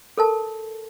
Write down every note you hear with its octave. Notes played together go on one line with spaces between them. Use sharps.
A4 A#4 A5